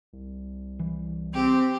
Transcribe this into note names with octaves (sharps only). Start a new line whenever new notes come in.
C2
E3
C4 G4